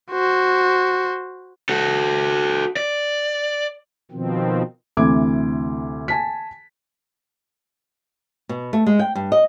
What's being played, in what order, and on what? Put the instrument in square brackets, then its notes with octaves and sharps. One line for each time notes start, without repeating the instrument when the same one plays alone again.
[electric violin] F#4 C5
[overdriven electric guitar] F#4 A4
D5
[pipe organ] B2 D#3 F3 C4
[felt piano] D2 C3 E3 D6 G#6
G#5 A5 B6
[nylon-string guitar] B2
A3
G#3
G5
G2
D#5